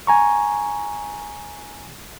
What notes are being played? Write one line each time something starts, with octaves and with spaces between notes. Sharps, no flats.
G#5 A#5 C#6